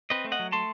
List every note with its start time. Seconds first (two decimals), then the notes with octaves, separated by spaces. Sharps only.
0.10 C4 B4 D#5
0.25 A3
0.32 D#5 F#5
0.39 F#3
0.52 A3 A5 C6